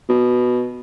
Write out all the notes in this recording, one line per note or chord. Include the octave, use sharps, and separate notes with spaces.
B2